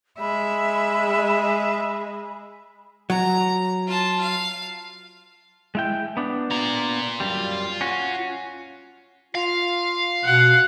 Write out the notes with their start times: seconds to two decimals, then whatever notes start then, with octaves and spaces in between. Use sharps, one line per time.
0.20 G#3 E5 B5
3.10 F#3 A#5
3.87 F4 A5
4.21 F5
5.75 G#3 E4 G5
6.17 B3 D4
6.51 F4 A#5
7.20 F#2 G3
7.81 C#4 F#4
9.35 F4 F5
10.25 B2 F#5